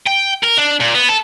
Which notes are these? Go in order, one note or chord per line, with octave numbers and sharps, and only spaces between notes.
G5
A#4
D4
A#2
B3
A4